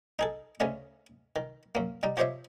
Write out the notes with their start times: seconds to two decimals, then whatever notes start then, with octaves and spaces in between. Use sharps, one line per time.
0.19 D#4 G#4 A4
0.60 D2 C#3 A3 C#4 D#5
1.36 D#3
1.75 F#2 A#3
2.03 G3 D#4
2.17 F3 G4 C5 C#5 D#5 E5